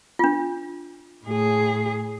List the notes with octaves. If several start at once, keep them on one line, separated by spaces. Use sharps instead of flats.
D4 F4
A2 G#4